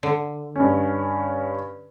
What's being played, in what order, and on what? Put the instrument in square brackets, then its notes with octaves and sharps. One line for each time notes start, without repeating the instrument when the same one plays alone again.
[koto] D3
[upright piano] G2 C#4